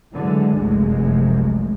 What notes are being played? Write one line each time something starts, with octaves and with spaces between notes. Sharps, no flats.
D3 E3 F#3 G#3
F1 C2 F#2 G#3 A3